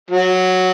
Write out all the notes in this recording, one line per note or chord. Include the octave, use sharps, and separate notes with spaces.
F#3